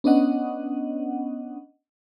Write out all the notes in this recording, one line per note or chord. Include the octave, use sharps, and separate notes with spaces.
B3 C#4 D4 D#5 F#5